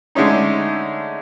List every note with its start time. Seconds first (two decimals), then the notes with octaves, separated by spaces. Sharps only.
0.15 D3 G#3 A3 C#4 D#4